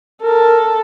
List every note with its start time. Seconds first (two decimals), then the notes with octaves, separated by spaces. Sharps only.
0.23 A4 A#4